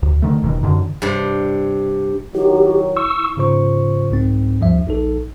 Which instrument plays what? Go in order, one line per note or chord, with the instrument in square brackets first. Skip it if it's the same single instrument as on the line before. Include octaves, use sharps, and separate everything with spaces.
[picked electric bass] D2
D3 D#3 A3
D#1 E2 B2 D#3
F#2 D3 D#3
[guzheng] G2 C3
[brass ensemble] D#3 F#3 [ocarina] E4 [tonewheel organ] G4
[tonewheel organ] C#6 E6
[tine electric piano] G#2 C#3 F4 C5 C#6
C2 G#2 C4
D2 G2 F3 E5
A#1 D#4 A4